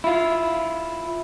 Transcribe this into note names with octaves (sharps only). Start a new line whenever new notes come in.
E4 F4